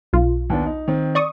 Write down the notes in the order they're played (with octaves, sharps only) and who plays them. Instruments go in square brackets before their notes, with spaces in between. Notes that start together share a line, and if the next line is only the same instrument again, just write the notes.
[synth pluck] B1 F4
[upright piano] D#2 B3 D4
D#4
D#3 C4
[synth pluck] D5 C#6 D#6